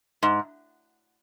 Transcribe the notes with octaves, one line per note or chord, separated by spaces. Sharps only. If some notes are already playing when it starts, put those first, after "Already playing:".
G#2